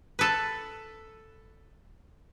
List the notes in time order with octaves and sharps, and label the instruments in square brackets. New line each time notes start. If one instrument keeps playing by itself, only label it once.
[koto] A4 B4